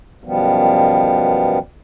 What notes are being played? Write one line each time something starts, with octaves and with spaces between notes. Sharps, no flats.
F#2 B2 D#3 F3 G3 B3